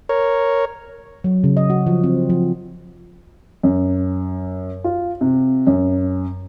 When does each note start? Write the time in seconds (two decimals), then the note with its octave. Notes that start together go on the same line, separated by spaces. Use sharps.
0.09 A#4 C#5
1.24 F#3
1.44 C#3
1.57 D#5
1.70 F#4
1.87 F3
2.04 C4
2.30 F3
3.63 F#2
4.84 F4
5.21 C3
5.67 F#2